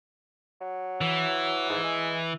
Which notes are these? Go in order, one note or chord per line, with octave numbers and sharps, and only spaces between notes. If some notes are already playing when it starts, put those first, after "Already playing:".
F#3
E3
G#2
G#3